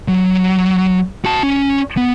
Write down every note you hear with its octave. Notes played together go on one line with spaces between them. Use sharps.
F#3
F#4 A5
C#4
B3